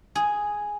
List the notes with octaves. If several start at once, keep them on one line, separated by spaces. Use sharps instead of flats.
G#4